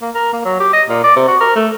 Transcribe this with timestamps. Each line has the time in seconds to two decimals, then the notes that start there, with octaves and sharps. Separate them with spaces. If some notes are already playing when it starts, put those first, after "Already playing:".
0.02 A#3
0.15 A#4
0.33 A#3
0.45 F#3
0.60 G4
0.73 D#5
0.89 A#2
1.04 D5
1.16 C3
1.28 F#4
1.41 A#4
1.56 A3